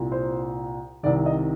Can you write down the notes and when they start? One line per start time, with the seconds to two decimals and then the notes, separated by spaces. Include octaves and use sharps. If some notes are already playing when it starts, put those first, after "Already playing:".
Already playing: C2 A#2
0.12 C5
1.03 C2 C3 D#3 D5
1.26 D#5